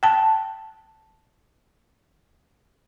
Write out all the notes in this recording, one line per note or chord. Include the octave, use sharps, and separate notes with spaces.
G5 A5